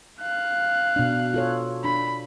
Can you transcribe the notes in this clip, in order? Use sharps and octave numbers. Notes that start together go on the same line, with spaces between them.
F5 F#6
B2 D4
F4 A4 C#5
D4 B5